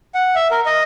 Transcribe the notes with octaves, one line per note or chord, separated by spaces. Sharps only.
F#5
E5
A#4
D#5